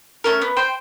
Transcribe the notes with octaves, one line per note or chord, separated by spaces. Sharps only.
A3 C#4 A#4
B3
C5 G5